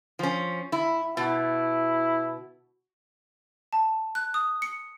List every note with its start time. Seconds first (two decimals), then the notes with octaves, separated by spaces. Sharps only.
0.19 F3 C#4
0.72 E4
1.17 B2 E4
3.73 A5
4.15 F#6
4.34 D#6
4.62 C#7